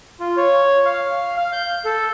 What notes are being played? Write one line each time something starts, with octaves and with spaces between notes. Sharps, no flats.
F4
C#5
F5
F5
G6
A4